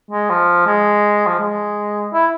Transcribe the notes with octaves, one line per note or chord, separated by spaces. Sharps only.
G#3
F3
G#3
F3
G#3
E4